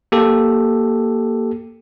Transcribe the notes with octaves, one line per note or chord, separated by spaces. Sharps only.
A#3 G4 A4